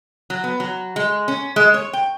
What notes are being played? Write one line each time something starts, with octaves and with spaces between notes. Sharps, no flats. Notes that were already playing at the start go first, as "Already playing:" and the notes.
F#3
B3
F#3
G#3
C#4
G#3
C#5
G5